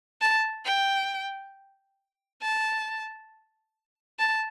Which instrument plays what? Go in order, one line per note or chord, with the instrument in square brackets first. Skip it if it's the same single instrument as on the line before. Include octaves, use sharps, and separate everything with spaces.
[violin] A5
G5
A5
A5